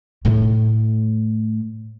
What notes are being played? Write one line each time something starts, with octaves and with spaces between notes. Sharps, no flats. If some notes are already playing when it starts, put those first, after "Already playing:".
A2 A3